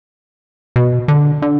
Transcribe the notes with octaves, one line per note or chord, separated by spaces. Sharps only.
B2
D3
D3